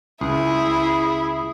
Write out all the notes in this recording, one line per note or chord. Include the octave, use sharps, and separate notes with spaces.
C#2 E4 G#4